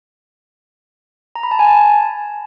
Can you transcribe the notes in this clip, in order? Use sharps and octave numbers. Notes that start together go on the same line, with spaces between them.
A#5
B5
A5
G#5
A5